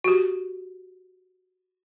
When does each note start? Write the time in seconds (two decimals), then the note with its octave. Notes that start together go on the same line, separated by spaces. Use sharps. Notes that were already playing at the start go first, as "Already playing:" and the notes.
0.04 F#4 G4